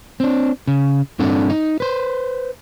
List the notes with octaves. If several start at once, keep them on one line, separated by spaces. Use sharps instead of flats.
C4 D4
C#3
G2 C4 D4 A4 F#5
D#4
B4 C5